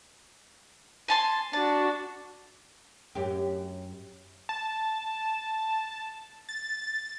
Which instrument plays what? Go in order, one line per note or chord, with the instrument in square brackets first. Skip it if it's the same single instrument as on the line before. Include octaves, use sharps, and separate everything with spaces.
[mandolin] G#5 A5 C6
[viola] D4 F#4 [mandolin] A5
[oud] F#2 G4
[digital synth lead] A5
A6